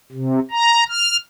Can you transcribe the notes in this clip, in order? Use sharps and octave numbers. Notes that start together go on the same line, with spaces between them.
C3
A#5
F6